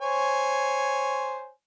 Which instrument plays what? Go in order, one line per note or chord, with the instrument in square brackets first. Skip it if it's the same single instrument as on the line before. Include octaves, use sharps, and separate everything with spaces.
[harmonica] C5 C#5 G#5